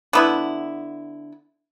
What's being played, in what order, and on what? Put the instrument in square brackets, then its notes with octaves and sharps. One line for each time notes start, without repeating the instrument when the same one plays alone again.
[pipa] D3 B3 E4